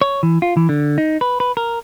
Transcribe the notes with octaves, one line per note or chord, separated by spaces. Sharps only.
C#5
E3
F4
E3
D3
D#4
B4
B4
A#4